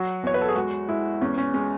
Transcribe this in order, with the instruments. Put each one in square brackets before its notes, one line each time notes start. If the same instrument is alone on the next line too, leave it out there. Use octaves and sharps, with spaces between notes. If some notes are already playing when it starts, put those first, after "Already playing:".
Already playing: [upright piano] F#3 F#4
E2 C#5
B4
A4
G#4
G#3 F#4
G#3 E4
E2 C#4
C#4
G#3 C#4